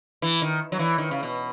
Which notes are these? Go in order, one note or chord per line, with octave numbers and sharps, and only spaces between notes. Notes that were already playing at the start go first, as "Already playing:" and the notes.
E3
D#3
F#3
E3
D#3
C#3
B2